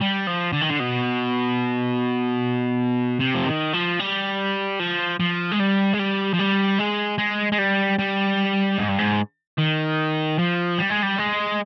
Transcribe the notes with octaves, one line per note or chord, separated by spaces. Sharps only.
G3
F3
D3
D#3
D3
B2
C3
F3
D#3
F3
G3
F3
F3
G#3
G3
G#3
G3
F3
G3
G#3
G#3
G#3
G3
G3
G#2
G2
G#2
D#3
F3
G3
G#3
G3
G#3